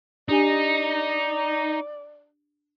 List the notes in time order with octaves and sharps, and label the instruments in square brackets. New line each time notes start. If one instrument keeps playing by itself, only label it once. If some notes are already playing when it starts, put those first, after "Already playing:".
[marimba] D4 G4 G#5 [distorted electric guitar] D#4 [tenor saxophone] D5